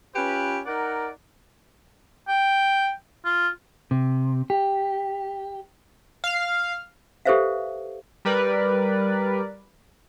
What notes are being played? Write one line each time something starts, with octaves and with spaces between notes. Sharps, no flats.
C#4 F4 G4 B4
D#4 A#4 D5 F#5
G5
F4
C3
G4
F5
G4 A4 B4 C5 E5 F5
G3 A#4 B4 D5